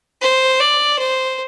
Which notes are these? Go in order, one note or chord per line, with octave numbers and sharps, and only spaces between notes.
C5
D5
C5